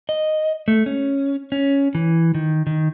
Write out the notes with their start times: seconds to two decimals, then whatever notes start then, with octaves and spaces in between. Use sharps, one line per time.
0.09 D#5
0.68 A3
0.86 C#4
1.52 C#4
1.95 E3
2.35 D#3
2.67 D#3